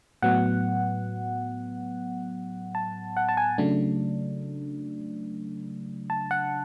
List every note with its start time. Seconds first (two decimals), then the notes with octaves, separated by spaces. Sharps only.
0.22 A2 F#3 B3 F#5
2.75 A5
3.17 F#5
3.29 A5
3.37 G#5
3.58 C#3 F#3 A3 D4
6.10 A5
6.31 F#5